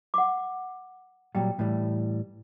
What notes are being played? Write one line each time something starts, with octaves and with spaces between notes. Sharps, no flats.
F#5 D6
A#2 F#3 G3 G5
A2 E3 G3